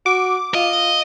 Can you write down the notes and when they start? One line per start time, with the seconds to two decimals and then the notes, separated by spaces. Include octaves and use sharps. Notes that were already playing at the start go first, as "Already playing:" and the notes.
0.06 F#4 D6
0.54 F4 D#5